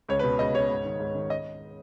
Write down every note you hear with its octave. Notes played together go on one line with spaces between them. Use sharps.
C#2 C#5
B4
B2
C#2 D#5
B2 C#5
G#2
D#3
G#2
D#3
D#5